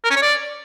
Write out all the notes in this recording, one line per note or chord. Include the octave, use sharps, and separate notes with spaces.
A#4
C#4
C#5
D5